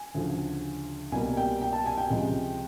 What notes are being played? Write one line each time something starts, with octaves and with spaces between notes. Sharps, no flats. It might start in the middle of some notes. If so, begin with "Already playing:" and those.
Already playing: G#5
D2 C#3 F3
C2 B2 G3 A#3 G#5
G5
G5
A5
G#5
G5
C#2 C3 F3 G#3